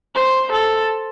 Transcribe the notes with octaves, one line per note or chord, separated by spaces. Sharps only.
C5
A4